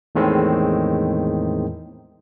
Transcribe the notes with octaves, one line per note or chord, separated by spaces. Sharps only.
E2 A2 D#3 G#3 C4